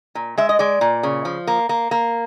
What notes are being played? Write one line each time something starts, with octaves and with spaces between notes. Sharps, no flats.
A#2
G#3 E5
D#5
G#3 D5
A#2
C#3
F3
A#3
A#3
A#3